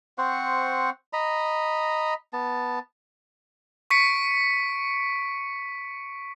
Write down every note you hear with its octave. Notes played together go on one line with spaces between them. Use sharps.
C4 C5 F#5 C#6
D#5 A#5 B5
B3 A5
C#6 B6 C#7 D7